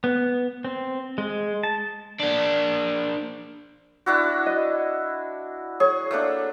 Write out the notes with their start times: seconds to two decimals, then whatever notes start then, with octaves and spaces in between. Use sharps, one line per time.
0.04 B3
0.65 C4
1.18 G#3
1.63 A5
2.20 A#3 D4
4.06 D4 E4 F#4
4.46 D#5
5.80 G#4 C#5
6.11 A3 A#3 D4